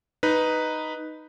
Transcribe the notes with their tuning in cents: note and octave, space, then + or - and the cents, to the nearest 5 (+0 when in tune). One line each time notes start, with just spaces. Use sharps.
D#4 +0 B4 +0